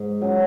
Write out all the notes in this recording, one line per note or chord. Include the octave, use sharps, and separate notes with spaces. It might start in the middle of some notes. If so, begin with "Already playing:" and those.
Already playing: G#2
F#3 C#4